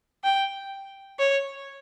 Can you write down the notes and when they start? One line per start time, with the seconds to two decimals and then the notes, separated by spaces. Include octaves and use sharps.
0.24 G5
1.19 C#5